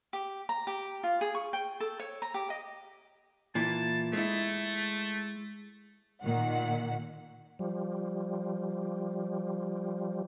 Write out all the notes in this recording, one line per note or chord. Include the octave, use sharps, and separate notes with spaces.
G4
A#5
G4
F4
G#4
C#6
G5
A4
C#5
A#5
G4
D#5
A#2 E3 E4 A5
G#3 A3 E4
A#2 D#3 F#5
F3 G3